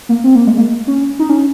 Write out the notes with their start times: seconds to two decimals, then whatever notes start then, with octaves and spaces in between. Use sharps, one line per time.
0.09 A#3
0.24 C4
0.35 A#3
0.47 G#3
0.58 A#3
0.87 C#4
1.19 D#4
1.29 C#4